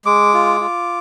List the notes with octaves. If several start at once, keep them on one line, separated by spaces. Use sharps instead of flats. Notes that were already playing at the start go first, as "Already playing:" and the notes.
G#3 D6
F4
F4